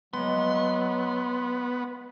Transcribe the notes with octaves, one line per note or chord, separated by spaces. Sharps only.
F#3 G#3 A#3 B3 C6